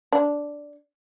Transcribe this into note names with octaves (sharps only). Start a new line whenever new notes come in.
D4